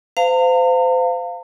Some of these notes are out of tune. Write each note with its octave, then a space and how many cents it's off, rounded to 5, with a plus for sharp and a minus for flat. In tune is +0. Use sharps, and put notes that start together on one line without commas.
C5 -35 F5 +0 A#5 -45